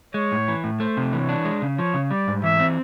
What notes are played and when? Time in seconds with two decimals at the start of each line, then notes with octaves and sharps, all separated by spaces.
0.14 G#3 C#5
0.32 A2
0.48 E3
0.64 A2
0.80 A3 C5
0.97 C3
1.13 E3 C#5
1.29 D4
1.45 G#3
1.62 C#3
1.78 F3 C#5
1.94 C#3
2.11 G3 D5
2.28 G#2
2.44 E3 E5
2.60 C4